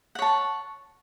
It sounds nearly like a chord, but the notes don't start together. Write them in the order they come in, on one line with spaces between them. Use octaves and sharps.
F#5 C#5 A5